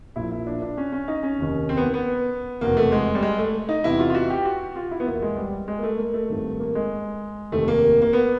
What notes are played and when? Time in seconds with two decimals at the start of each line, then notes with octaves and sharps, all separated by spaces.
0.16 A#1 A#2 F3 E4
0.31 E4
0.47 D4
0.62 D4
0.77 C#4
0.92 C#4
1.08 D#4
1.23 C#4
1.39 F1 D#2 D#3
1.69 C4
1.77 B3
1.85 A#3
1.94 B3
2.61 F1 E2 B2 A#3
2.77 A3
2.92 G#3
3.15 G3
3.22 G#3
3.38 A3
3.69 D#4
3.84 E2 C3 E3 E4
3.99 F4
4.10 F4
4.14 F#4
4.30 G4
4.45 F#4
4.76 F4
4.91 E4
5.00 B3
5.06 E2 B2 A#3
5.22 G#3
5.37 G3
5.68 G#3
5.79 A#3
5.83 A3
5.98 A#3
6.14 A3
6.29 G#1 G2 D#3
6.60 A#3
6.75 G#3
7.52 F1 D#2 D#3 A3
7.68 A#3
8.02 A#3
8.13 B3